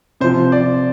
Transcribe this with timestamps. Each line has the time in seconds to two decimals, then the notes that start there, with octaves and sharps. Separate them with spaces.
0.21 C3 F3 C5
0.52 D5